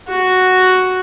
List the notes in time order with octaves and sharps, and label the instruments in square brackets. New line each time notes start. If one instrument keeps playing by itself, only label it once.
[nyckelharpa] F#4